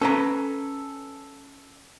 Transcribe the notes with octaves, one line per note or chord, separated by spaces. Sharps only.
C#4 A4 B4 A#5